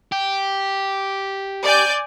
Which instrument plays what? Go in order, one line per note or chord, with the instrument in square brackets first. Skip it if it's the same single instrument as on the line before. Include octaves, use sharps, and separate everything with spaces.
[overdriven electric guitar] G4
[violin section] D5 G#5 G6